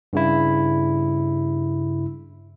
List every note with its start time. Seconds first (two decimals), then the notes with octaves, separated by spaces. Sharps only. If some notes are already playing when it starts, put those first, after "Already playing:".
0.13 G2 C#3 E4